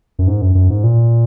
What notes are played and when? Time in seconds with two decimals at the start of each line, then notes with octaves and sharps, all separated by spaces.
0.19 F#2
0.28 G#2
0.41 F#2
0.55 F#2
0.70 G#2
0.84 A#2